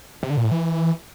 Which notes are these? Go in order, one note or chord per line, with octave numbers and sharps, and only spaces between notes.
C3
D3
A#2
A2
E3